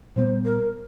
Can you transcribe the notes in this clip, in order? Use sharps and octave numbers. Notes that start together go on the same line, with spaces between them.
A#2 G3 B3 C5
A#4